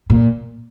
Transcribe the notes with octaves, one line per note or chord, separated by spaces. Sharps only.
A#2